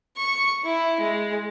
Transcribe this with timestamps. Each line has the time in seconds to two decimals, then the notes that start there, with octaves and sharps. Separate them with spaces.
0.17 C#6
0.64 E4
1.00 G#3